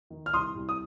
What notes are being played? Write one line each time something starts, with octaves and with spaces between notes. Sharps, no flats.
D#3
F6
C2 C6 D#6
C2
D#6